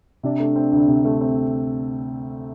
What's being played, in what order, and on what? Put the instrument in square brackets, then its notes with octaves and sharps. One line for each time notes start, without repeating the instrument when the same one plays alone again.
[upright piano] C3 [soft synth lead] D4
[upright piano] A3
C4
D2
C3
A3
C4